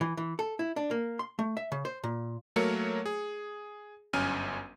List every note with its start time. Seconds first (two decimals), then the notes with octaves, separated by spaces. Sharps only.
0.01 E3
0.17 E3
0.39 A4
0.59 E4
0.76 D4
0.91 A#3
1.19 C6
1.39 A3
1.57 E5
1.72 C#3
1.85 C5
2.04 A#2
2.56 F#3 A3 A#3 A#4 C#5 C#7
3.06 G#4
4.13 G1 F#2 C#4 G#5 F6 D#7